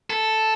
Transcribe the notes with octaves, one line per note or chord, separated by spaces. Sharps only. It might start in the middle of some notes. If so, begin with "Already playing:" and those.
A4